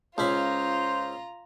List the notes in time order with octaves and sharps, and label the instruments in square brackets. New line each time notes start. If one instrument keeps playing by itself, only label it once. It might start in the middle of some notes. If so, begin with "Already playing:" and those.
[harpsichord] C#2 C#4 B5 [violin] F4 A#5 [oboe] C5